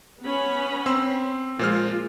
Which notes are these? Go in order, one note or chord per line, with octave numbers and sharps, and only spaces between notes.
B3 C#4 B5
C4 C6 E6
A#2 F3 G#3 F4 C5 F6